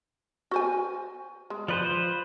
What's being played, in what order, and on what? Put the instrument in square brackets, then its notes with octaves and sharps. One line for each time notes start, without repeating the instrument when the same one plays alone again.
[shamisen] F#4 C5 G#5
G#3
[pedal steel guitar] F3 B4 C5 [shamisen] D5